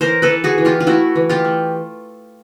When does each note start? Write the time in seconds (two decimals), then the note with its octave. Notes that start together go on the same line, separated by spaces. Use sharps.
0.01 E3 A#4 C5
0.22 A4 B4
0.30 E3
0.44 F#4 G#4
0.58 E3
0.65 F4 G4
0.80 F4
0.86 A3 E4 F#4
1.15 E3
1.29 F4 G4
1.44 A3